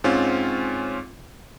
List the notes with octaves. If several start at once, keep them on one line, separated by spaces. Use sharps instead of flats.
G#2 C4 C#4 F4